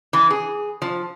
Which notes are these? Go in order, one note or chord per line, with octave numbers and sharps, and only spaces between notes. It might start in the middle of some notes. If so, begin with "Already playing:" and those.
E3
G#4
F3